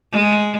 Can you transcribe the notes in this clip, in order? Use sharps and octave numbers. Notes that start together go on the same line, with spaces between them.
G#3